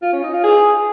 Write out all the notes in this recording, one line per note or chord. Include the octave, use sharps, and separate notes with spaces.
F4
C#4
D#4
F4
G#4